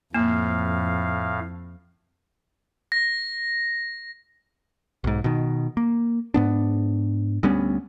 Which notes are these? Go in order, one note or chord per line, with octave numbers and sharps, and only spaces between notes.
F2 A2 A#3 F5
A#6
B1 G#2
B2 D#3
A#3
G#2 B3 D4
D2 G3 B3 C#4